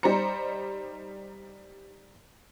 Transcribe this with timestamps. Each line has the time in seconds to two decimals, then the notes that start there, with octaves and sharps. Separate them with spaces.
0.03 G3 D#4 C5 A#5 C#7